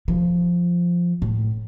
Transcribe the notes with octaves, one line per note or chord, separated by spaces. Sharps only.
F3
A2